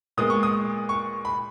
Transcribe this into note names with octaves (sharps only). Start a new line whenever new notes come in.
A#2 G#3 B3 D#6
C#6
D#6
C#6
B5